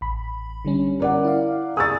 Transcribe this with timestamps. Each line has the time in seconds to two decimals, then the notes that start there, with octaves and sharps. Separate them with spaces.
0.01 A1 B5
0.65 D3 G3 C#4
1.00 A#4 D5 F#5
1.24 E4 F5
1.77 G#4 G#5 D#6 E6 A6